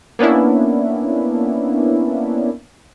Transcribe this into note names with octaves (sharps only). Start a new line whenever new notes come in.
A#3 B3 C#4 D4 E4